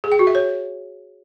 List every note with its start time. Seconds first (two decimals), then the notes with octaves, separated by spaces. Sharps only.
0.04 G#4
0.12 G5
0.19 F#4
0.27 E5
0.35 C#5